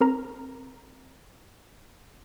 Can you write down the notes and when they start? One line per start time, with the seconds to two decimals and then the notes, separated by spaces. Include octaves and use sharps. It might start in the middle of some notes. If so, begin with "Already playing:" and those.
0.01 C4 A#4 A#5